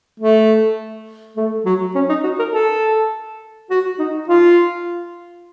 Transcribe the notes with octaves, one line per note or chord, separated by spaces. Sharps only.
A3
A3
F#3
C#4
D#4
F#4
A#4
A4
F#4
D#4
F4